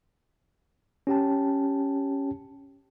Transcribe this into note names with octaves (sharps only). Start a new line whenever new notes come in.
C#4 G4 G5 A5